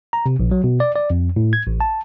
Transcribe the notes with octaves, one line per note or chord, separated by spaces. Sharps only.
A#5
C3
A#1
F#3
B2
D5
D5
F2
A2
G#6
A1
A5